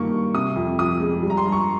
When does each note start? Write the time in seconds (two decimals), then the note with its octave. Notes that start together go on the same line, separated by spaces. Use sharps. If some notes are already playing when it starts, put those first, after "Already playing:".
Already playing: G2 D#3 A#3 C#6
0.12 G2
0.34 C3 D#6
0.56 F2
0.79 F3 D#6
1.00 G#3
1.22 G3
1.30 A#5
1.37 C6
1.46 G2
1.52 C#6